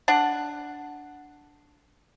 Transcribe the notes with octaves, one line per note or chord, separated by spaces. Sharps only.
D4 F#5